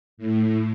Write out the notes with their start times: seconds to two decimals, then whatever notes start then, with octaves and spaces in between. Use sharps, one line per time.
0.17 A2